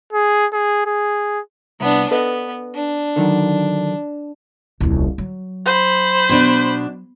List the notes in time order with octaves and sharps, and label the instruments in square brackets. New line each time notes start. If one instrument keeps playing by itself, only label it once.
[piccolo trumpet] G#4
G#4
G#4
[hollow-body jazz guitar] C2 [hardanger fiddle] B3 D4
[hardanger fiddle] B3 [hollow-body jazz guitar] A4 B4 D#5
[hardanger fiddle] D4
[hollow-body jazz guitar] D3 D#3 F#3
[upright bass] D#1 C2
F#3
[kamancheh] C5 B5
[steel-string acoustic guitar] B2 D4